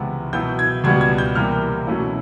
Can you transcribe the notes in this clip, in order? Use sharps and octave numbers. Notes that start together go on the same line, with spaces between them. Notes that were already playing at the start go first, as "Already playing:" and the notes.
Already playing: C#2 C3 E3 G#3 B3
B2 F#3 B3 E4 G6
G#6
C#2 B2 G3 B3 G#6
G#6
G6
C3 E3 G3 A#3 F6
B2 F#3 A3 C#4 E4